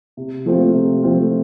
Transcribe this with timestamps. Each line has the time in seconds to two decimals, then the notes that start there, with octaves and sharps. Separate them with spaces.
0.17 C3
0.46 F3 A3 C4 F4
0.74 C3
1.03 F3 A3 C4 F4